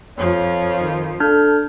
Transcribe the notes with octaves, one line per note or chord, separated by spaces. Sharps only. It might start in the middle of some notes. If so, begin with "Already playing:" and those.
F2 F3 C#5
D#3
D4 A4 F6 G6